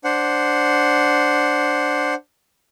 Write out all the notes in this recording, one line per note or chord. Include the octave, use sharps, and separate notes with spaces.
D4 C5 F#5